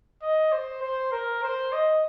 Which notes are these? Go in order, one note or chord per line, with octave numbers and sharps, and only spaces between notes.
D#5
C5
C5
A#4
C5
D#5